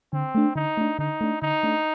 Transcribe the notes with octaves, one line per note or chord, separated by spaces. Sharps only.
D3 C4
A3 D4
D3 D#4
A3 D4
D3 D#4
A3 D4
D3 D#4
A3 D4